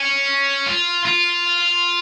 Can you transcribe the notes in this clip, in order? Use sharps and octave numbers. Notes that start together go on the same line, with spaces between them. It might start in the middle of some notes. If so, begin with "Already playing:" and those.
Already playing: C#4
F4
F4